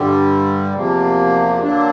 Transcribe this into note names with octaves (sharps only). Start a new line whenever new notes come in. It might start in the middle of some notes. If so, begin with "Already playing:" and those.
Already playing: G2 D3 G3
E2 C3 F3 A#3
D3 F#3 A#3 D4